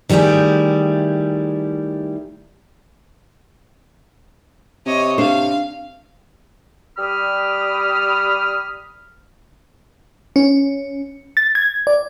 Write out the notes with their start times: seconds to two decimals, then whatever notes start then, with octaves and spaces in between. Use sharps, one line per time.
0.09 D#3 G3 A3 E4 G#4
4.86 C3 C#5 D#5
5.18 D4 C5 F5
6.98 G3 B5 D#6 F6
10.36 C#4
11.37 A6
11.55 G#6
11.87 D5